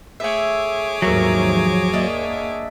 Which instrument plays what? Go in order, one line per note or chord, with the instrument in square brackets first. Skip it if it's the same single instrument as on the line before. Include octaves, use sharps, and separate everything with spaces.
[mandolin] A3 E5 [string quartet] G#4 C#5 D6
[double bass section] D#2 G#2 F3 [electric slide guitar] F#3 [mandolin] A3 A#4 E6
[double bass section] A#3 [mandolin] D4 D#5 E5